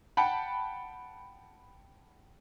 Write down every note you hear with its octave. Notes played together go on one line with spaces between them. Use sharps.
F#5 G5 A5 B5